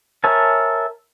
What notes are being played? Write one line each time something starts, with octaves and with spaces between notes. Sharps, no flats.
A#4 C#5 E5 G#5 A5